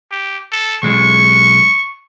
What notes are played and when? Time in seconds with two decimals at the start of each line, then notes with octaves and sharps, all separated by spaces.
0.11 G4
0.52 A4
0.83 B1 G#3 C#6